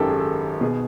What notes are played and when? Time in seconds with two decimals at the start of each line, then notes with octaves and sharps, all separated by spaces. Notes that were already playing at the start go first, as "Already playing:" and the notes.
Already playing: G#1 F#2 D#3 G4 A4
0.09 G#4
0.20 A4
0.61 B2 G#4